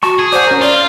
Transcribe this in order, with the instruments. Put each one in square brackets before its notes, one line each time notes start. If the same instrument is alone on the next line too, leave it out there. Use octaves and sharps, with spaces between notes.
[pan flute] F#4 [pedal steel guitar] A5 C#6
[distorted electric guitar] G#4
[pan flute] C5 [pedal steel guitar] D5 F#5
[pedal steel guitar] C#4 A#4
[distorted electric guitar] F4 [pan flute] D5
[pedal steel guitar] F5